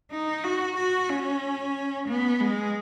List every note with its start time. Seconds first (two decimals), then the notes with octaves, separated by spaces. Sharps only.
0.11 D#4
0.44 F#4
0.77 F#4
1.09 C#4
2.08 B3
2.40 G#3